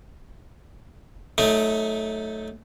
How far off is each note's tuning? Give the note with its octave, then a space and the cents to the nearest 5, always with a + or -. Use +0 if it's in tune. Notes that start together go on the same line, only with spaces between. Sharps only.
F#3 +0 A3 -10 D#4 +15